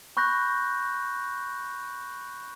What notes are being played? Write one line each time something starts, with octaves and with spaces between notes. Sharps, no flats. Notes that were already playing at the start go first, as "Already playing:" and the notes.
B5 C#6 F#6 G6 A#6